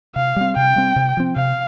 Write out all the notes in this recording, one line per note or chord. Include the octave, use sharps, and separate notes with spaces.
C3 F5
G3 C4
C3 G5
G3 C4
C3
F3 C4
C3 F5